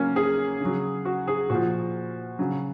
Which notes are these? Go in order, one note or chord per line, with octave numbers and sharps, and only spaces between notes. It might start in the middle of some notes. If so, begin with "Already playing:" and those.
Already playing: C#3 F#3 A#3 C#4
G#4
C#3 F#3
F#4
G#4
A#2 F3 F#4
C#3 F#3